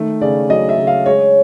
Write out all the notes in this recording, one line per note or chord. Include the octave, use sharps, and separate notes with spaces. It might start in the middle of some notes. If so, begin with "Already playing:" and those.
Already playing: D#3 A3
C#3 D5
F#3 D#5
E5
C#3
F5
G#3 C#5